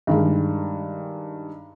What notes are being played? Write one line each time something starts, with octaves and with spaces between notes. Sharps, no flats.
G2 D#3 G#3